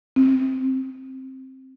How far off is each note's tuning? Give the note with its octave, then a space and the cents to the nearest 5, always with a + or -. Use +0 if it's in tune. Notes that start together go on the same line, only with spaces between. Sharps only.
C4 +10